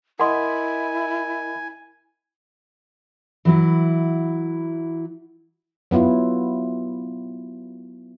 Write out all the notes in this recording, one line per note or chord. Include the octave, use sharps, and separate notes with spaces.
E4 A#4 D#5 F#5 G#5 C6
E3 F#3 E4
F#3 B3 E4 F4